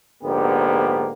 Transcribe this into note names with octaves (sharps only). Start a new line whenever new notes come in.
A#1 G#2 D3 A#3 B3 G4